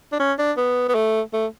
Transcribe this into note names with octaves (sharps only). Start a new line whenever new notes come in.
D4
C#4
D4
B3
B3
A3
A3